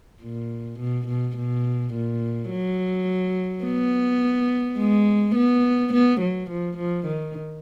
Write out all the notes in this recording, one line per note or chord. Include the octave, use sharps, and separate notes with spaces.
A#2
B2
B2
B2
A#2
F#3
B3
G#3
B3
B3
F#3
F3
F3
D#3